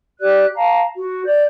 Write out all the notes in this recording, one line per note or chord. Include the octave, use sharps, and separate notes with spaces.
G4 D5 F#6
F5 A5 A#5
F#4
D5 G6